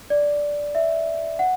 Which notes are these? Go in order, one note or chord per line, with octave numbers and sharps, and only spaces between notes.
D5
E5
F#5